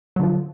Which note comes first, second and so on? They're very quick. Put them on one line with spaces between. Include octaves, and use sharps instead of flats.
F#3 D3 F3